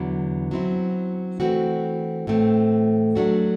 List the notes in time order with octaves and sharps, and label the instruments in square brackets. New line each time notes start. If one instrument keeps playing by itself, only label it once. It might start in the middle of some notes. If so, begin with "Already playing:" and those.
Already playing: [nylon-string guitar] E2 D3 F#3 B3 E4
F#3 C4 E4
E3 A3 C4 F#4
A2 E3 A3 C4
F#3 A3 D4 F#4